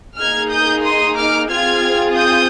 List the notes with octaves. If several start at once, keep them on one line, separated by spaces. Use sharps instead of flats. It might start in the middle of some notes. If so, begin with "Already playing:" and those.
A#3 D#4 G#4 F6 G#6
D#6 G6
C6 D#6
D6 F6
C4 F4 G#4 F6 G#6
D#6 G6